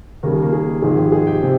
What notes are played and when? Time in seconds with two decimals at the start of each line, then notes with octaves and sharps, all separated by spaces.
0.23 D#2 C#3 G3 A#3 A#4
0.33 G#4
0.43 A#3 A#4
0.53 G#4
0.82 G#1 G#2 F3 G#3 G#4
0.97 G4
1.12 G#4
1.27 G4 G5
1.42 C3